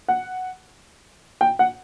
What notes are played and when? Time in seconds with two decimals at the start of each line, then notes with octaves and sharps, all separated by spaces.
0.08 F#5
1.41 G5
1.59 F#5